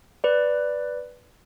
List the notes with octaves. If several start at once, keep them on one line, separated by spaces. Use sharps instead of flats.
B4 D5